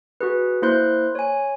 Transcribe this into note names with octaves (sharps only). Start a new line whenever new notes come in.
F#4 G#4 B4
A#3 E4 C5 C6 F#6 G6
C#5 G#5